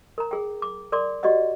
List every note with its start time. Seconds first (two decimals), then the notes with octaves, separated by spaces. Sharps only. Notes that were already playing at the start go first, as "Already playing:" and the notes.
0.18 A#4 A#5
0.31 G#4 G5
0.62 D6
0.92 A#4 D5 C6 D6
1.23 F#4 G4 D5 D#5 F#5